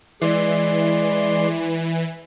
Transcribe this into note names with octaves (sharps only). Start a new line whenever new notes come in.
E3 G#3 D5 C6